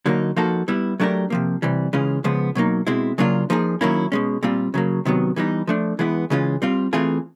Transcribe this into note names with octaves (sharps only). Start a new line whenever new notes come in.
D3 F#3 A#3 D#4
F3 A#3 D#4 F#4 A4
G3 B3 E4
F#3 A3 D4 G4 A#4
C3 F3 A#3
C3 E3 G3
C#3 E3 G#3 C#4 F4
C#3 F3 G#3 B3
B2 F#3 A#3 D#4
B2 G#3 C4 E4
C#3 F#3 A#3 D4 F4
F3 A#3 D#4 G#4
D#3 F#3 A#3 C#4 E4
B2 G#3 C#4
A#2 G3 C4 F4
C#3 F#3 A#3
C3 D#3 F#3 B3
E3 G3 B3 D#4
F3 A3 D4
E3 G#3 B3 E4
C#3 E3 G#3 C#4 F4
G3 C4 F4
E3 A3 C4 F4 G#4